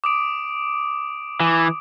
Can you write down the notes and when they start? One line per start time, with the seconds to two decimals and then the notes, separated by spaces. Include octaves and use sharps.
0.04 D6 D#6 D7
1.40 E3